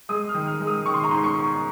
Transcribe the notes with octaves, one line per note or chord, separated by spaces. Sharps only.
G#3 D#6
F6
D#3
F6
G#3
D#6
D#3 C#6
C6
A#5
G#2 C6
C#6